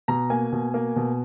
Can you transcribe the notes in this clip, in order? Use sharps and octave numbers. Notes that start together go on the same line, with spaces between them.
B2 A#5
A#3 G#5
B2
A#3
B2